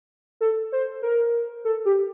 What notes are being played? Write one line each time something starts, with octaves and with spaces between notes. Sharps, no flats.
A4
C5
A#4
A4
G4